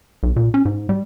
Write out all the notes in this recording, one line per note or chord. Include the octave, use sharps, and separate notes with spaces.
B1
A#2
C#4
G#2
G3